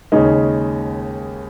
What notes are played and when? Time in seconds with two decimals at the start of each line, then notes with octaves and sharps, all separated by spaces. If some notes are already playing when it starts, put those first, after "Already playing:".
0.12 D#2 C#3 G#3 D#4